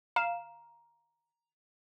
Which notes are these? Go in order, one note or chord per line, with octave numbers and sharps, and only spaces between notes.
F5 A#5